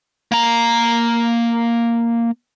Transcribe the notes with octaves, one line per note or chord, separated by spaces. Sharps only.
A#3 A#5